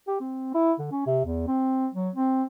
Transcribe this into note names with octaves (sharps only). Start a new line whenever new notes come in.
G4
C4
E4
D3
C#4
C3
E2
C4
F#3
C4